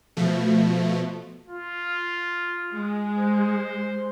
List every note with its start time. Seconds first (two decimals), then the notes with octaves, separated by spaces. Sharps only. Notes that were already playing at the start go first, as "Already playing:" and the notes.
0.17 B2 F3 A3
1.48 F4
2.71 G#3
3.18 C5